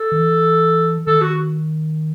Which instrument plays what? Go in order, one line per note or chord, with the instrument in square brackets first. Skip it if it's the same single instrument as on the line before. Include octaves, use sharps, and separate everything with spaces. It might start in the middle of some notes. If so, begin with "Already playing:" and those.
Already playing: [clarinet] A4
[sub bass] D#3
E3
[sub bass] D#3 [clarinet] A4
[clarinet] F#4